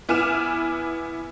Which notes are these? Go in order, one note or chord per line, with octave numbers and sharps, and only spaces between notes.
B3 E4 G#5 D6 F6 E7